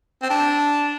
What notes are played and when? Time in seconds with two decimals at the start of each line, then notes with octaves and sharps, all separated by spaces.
0.22 C4
0.30 D4